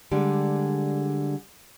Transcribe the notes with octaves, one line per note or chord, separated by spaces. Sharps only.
D3 G3 G#3